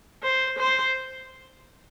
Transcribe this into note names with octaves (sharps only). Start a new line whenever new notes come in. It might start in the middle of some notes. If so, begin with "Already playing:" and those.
C5
C5